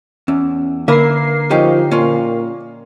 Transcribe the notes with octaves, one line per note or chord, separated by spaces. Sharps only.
E2 C#4
D3 A#3 A#4 B4 E5 C7
F3 C#4 D#4 G4
A#2 C#4 F4